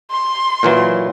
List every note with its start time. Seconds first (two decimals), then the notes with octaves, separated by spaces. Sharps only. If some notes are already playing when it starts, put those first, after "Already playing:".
0.11 C6
0.63 A#2 E3 F#3